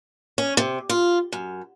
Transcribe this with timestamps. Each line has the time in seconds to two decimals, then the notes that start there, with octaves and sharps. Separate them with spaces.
0.38 C#4
0.57 C3
0.89 F4
1.32 F#2